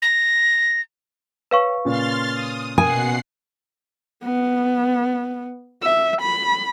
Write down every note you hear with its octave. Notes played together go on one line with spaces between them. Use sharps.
A#6
B4 C#5 F5 C#6
A#2 C#3 C6 F6 A6
D#6
B2 A#4 F#5 G#5 C7
B3
E5
B5